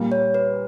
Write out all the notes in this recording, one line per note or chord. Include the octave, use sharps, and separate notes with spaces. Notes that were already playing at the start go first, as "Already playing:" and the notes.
Already playing: A#2 G3 A#3
C#5
B4